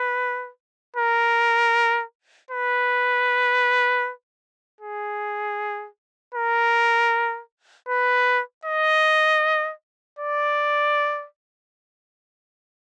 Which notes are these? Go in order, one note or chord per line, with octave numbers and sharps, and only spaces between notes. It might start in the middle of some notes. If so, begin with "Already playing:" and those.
Already playing: B4
A#4
B4
G#4
A#4
B4
D#5
D5